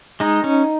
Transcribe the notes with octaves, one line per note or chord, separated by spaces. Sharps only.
G#3 D#4
C#4